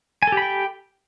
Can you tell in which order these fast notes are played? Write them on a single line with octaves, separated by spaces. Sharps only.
G#5 A4 G4 B5 G5